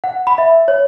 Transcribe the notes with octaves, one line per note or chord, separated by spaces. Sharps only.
F#5
B5
E5
C#5